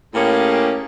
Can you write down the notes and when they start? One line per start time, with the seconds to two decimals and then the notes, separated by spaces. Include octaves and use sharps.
0.15 A2 A#3 C#4 G4 G#4